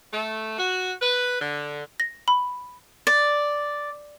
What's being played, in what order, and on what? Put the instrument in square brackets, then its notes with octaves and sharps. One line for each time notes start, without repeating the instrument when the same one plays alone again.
[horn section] A3
F#4
B4
D3
[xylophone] A#6
B5
[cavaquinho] D5